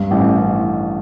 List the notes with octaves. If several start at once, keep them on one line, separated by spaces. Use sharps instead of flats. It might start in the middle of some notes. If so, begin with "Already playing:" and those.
Already playing: G2
A1